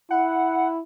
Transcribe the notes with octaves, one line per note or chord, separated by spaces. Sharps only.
E4 F#5